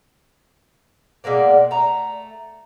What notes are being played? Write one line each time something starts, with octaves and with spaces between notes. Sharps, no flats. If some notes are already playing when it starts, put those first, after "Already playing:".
B2 G#3 A#3 D5
A3 A#5